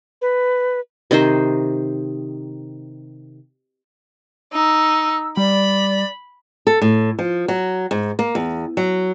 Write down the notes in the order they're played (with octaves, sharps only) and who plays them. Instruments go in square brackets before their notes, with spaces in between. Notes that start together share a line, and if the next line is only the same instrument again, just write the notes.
[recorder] B4
[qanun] C3 D#3 D#4 C5
[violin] D#4 [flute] E6
[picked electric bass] G3 [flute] D5 [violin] B5
[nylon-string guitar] A4
A2
F3
F#3
G#2
A#3
E2
F#3